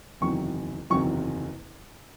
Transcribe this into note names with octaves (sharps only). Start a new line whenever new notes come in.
F#1 E2 C3 D#3 F#3 C#6
F#1 E2 C3 D#3 F#3 C#6